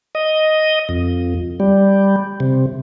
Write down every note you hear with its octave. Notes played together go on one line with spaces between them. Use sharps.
D#5
F2
G3
C3